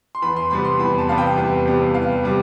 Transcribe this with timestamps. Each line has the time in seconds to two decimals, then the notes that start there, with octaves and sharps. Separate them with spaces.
0.15 C6
0.22 E2 B5
0.36 C6
0.50 C3 G3 B3 B5
0.65 C6
0.79 E2 B5
0.98 A5
1.08 C3 G3 B3 F5
1.18 G5
1.37 E2
1.66 C3 G3 B3
1.94 E2 F5
2.23 C3 G3